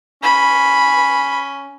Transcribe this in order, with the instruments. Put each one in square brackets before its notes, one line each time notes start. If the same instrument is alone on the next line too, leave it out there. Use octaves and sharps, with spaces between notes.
[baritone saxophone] C#4 [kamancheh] B5